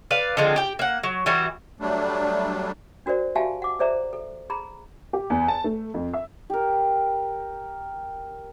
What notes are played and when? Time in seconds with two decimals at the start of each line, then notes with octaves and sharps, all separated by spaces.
0.11 B4 D5 F5
0.37 D3 F3 G#3 C4
0.56 G4 G5
0.79 A#3 F#5
1.03 F#3
1.26 E3 G3 E4 F#4
1.80 F#3 G3 A3 D4
3.06 D4 F#4 A#4 C5 D5
3.35 F#4 G4 E5 F5 G#5 A5
3.62 F#5 D6
3.79 G#4 A4 C5 D5 E5 A#5
4.13 A4
4.50 G#4 A#5 B5
5.13 G4
5.30 E2
5.48 A5
5.64 A3
5.94 F2
6.13 E5
6.50 G4 A#4